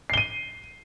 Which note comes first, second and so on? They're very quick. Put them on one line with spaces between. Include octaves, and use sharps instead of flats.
C7 G7 D#7